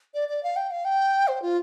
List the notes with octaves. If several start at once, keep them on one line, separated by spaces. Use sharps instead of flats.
D5
D5
F5
G5
F5
G5
C5
F4